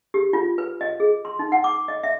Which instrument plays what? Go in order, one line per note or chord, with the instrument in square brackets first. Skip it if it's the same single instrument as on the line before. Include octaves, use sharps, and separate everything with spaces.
[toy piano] G4
F4
B4
D#5
G#4
C6
D#4
F#5
D6
D#5
E5